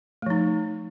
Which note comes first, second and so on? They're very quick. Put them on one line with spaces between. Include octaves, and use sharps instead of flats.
A3 F3 D#4